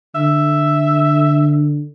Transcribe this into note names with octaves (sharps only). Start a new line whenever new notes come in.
D3 E5